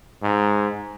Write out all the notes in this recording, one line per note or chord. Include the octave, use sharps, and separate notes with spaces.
G#2